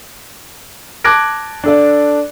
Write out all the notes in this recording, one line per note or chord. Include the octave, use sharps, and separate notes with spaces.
A5 D6 F#6 G#6 A#6 D7
D4 A4 D5